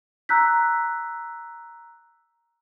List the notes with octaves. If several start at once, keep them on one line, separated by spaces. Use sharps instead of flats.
A#5 E6 F#6 G6 B6